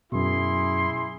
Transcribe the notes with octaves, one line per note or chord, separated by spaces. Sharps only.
F#2 B2 E4 G#4 C6